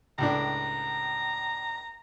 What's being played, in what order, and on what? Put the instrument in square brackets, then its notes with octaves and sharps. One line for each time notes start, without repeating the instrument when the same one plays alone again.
[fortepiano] C#2 A2 D4 [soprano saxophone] A#5